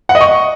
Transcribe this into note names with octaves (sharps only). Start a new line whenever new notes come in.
F#5
D#5
C#6